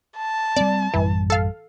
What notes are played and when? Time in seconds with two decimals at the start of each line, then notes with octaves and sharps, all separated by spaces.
0.16 A5
0.56 G3 B3 C4 D5
0.94 A1 F#2 E3 G3
1.30 A4 F5